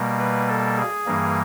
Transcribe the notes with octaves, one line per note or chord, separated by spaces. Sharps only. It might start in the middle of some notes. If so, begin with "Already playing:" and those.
Already playing: B2 G3 A#3
B4
A4
G#4
G2 E3 G3 A#3